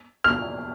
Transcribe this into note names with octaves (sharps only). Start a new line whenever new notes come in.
F6